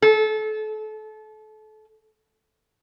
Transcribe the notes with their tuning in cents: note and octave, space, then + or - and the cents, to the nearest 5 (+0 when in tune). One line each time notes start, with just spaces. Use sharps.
A4 -30